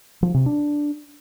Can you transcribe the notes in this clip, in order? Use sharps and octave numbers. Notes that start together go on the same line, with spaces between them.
F3
C3
D4